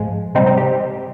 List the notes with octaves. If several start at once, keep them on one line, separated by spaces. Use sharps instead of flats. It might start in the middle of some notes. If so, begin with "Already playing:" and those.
Already playing: G#2 F3 G#3
C3 G3 C4 D#4
C4 D#4
G4